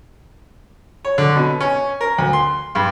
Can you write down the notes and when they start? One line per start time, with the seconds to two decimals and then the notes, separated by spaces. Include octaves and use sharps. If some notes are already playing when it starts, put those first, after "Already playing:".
1.05 C#5
1.18 D3
1.35 B2
1.60 C#4
2.01 A#4
2.18 D2
2.33 C6
2.75 G2